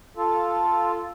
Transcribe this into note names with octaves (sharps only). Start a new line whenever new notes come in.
F4 A4